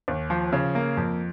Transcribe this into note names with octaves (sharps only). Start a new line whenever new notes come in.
D#2
F3
C#3
A#3
F2